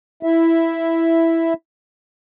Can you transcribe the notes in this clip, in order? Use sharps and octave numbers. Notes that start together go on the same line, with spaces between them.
E4 E5